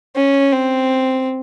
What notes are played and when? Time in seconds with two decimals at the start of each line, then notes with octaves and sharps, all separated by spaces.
0.16 C#4
0.52 C4